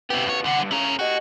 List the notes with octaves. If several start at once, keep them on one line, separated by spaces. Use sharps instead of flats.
C#3 B3 E4 G4
E2 C#5
C2 D3 F#5
E2 G2
C#3 E4 A#4
F#4 G4 D#5